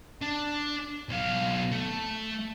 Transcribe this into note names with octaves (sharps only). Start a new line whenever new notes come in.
D4
B1 F5
A3